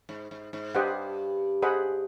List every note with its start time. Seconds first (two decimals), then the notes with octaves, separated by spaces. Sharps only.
0.09 G#2
0.31 G#2
0.53 G#2
0.75 G2 G4 C5 D#5 F#5
1.62 G#4 C5 D#5 F#5 B5